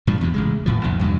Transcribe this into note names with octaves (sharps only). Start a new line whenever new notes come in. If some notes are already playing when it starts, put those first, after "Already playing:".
G2 A#2 F3
E2 G2 C3 F#3
A1 C#3 G#3
D#1 A2 F3
C2 F2 A#2 D#3
E2 G2 C3 F#3